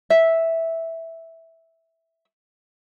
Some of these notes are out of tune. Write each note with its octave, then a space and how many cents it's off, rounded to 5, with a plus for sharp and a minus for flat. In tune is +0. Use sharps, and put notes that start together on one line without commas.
E5 -5